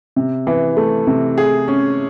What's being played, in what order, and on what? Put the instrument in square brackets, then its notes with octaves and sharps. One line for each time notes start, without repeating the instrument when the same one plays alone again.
[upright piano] C3
E3
A3
C3
G#4
C#4